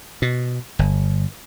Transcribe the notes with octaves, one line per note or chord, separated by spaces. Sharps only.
B2
G1